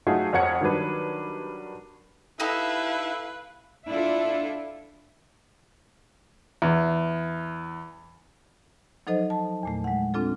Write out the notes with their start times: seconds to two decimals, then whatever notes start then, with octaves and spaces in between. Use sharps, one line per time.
0.07 F#3 A3 D#4 F4 F#4 G#4
0.33 F2 A#4 C#5 F#5 G#6 C#7
0.61 D#3 F#3 G3 D4 B4
2.40 D#4 E4 G4 A4 B4 F5
3.89 D4 E4 F4 A4 E5
6.62 E2
9.07 F3 F#3 D#4 A4 C5 D#5
9.30 A5
9.63 E2 A#2 A3
9.84 G#3 F#5
10.14 C4 D4 F4 A4